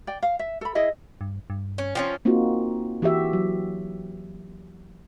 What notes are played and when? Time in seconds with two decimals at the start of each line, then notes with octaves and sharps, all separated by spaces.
0.07 D5 G5
0.22 F5
0.39 E5
0.61 A4 B5
0.75 E4 G#4 D#5 E5
1.21 G2
1.50 G2
1.78 C#4
1.95 F3 C4 C#4
2.25 A#3 C4 D#4 F4 F#4
3.02 E3 F#4 G4 E5
3.33 F#3